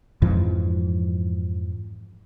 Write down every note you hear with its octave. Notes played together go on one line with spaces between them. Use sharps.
F2 G#2 E3 F3